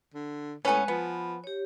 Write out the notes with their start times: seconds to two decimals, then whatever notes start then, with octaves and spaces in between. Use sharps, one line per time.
0.14 D3
0.65 A2 G#3 B3 C#4 B4 G#5
0.88 F3 B3 B5
1.44 G4 C#5